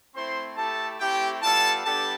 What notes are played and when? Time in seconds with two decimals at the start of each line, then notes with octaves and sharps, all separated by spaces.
0.15 A3 C4 E4 C5 C6
0.57 A3 E4 G4 A4 A5
1.00 A3 C4 E4 G4 G5
1.43 G3 B3 F4 A4 A5
1.85 G3 B3 D4 G4 A4 A5